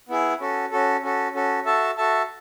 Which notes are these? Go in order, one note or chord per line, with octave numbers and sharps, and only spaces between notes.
B3 E4 G#4
C#4 F#4 A4
C#4 F#4 A4
C#4 F#4 A4
C#4 F#4 A4
F#4 A4 E5 A5
F#4 A4 E5 A5